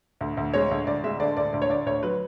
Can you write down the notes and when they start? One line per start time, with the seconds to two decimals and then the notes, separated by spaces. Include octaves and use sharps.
0.21 D2
0.37 D2
0.54 G#3 C#5
0.71 D2
0.87 D2 D5
1.04 G#3 E5
1.20 D3 D5
1.37 D2 D5
1.53 D2 D5
1.62 C#5
1.69 D2 D5
1.86 D2 C#5
2.03 F#3 B4